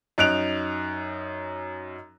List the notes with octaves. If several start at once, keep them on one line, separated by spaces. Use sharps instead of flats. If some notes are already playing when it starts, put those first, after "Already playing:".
F#2 D#4 F#6 D7 F7